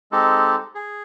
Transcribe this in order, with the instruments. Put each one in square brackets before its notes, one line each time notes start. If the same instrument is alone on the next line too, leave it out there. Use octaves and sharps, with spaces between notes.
[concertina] G#3 C4 D#4 G4 A4
G#4